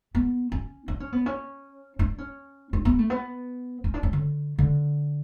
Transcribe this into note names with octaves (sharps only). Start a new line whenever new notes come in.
B3
C#4
D4
C#4
B3
C#4
D4
C#4
D4
B3
A3
B3
C#4
D4
C#4
D3
D3